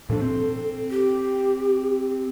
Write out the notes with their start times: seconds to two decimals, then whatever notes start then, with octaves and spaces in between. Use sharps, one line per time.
0.10 A#2 F3 D4 A4
0.22 C4
0.91 G4